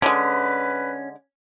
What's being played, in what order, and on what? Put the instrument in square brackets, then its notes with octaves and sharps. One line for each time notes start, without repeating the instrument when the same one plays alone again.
[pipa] D3 G#3 [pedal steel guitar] C#4 [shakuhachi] B4